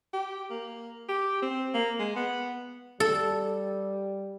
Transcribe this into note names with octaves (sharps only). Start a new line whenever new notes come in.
G4
A#3
G4
C4
A#3
G#3
B3
G3 A4